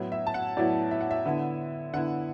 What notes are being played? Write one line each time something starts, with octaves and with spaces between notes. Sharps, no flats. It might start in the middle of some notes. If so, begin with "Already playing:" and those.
Already playing: A2 F#3 B3 E4
E5
A5
F#5
A2 F#3 B3 E4 D5
E5
F#5
E5
D3 B3 E4
D3 B3 E4 F#5